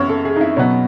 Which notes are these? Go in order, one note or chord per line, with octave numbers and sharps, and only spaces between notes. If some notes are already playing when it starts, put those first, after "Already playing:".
Already playing: F#2 E3 B3 C#5
A4
G#4
D#4
E4
B2 F#3 B3 C#4